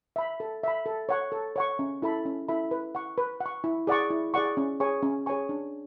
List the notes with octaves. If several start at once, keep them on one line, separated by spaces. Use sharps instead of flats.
E5 B5
A4
E5 B5
A4
C#5 F#5 C#6
A4
C#5 F#5 C#6
C#4
E4 A4 E5 B5
C#4
E4 A4 E5 B5
B4
F#5 C#6
B4
F#5
C#6
E4
G#4 D5 F#5 C#6
E4
G#4 D5 F#5 C#6
C#4
G#4 C#5 G#5 C#6
C#4
G#4 C#5 G#5 C#6
D4